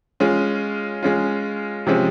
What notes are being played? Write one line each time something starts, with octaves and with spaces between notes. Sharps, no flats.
G#3 C#4 F4
G#3 C#4 F4
C3 F3 G#3 C#4